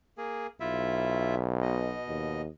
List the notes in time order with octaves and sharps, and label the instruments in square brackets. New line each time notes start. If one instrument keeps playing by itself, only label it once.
[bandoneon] A#3 G#4
[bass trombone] B1 [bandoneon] E4 F4 E5
[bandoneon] B2 D#5
[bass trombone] D#2